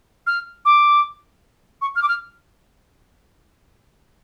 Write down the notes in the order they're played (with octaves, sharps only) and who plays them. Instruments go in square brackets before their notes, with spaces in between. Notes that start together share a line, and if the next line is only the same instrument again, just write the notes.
[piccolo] F6
D6
C#6
F6
D6
F6